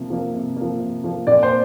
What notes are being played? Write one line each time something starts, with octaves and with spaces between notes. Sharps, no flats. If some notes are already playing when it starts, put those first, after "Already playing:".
Already playing: C3 F3 A#3
F3 A#3
C3
F3 A#3
C3
F3 A#3
A#2 D5
C5